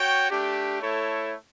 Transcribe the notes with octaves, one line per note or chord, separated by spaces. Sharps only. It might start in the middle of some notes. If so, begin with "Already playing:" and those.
Already playing: F#4 C#5 G5
A3 D4 G4
A3 E4 A4 C#5